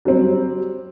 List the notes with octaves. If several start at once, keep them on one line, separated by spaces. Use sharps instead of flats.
F#3 G3 C4